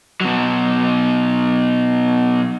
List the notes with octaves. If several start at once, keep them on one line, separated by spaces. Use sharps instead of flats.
B2 F#3